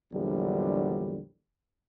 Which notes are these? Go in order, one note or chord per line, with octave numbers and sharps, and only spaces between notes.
A#1 E2 D3 F#3 G3